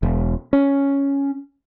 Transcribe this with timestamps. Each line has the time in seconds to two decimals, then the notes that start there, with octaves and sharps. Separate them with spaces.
0.03 E1
0.53 C#4